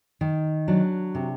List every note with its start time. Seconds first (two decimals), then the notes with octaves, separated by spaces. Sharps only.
0.21 D#3
0.68 F#3 D4
1.15 C3